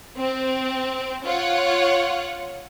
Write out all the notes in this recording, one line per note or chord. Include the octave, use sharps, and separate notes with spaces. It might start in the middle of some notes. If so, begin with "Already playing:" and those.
C4
F4 C#5 F#5